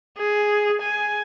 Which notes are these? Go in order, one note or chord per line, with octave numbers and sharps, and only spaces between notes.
G#4
G#5